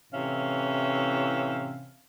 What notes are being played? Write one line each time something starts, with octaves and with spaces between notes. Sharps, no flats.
A2 C3 E3 C#4 E5 F5